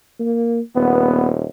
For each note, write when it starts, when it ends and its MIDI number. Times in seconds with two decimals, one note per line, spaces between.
0.20 0.60 58
0.75 1.45 27
0.75 1.28 59